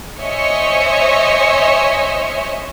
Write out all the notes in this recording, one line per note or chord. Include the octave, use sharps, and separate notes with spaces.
C5 C#5 D#5 E5 G#5 C#6